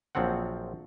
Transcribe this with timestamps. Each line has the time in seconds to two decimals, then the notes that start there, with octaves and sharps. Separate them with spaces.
0.15 A#1 F3 F#3 C4 F#5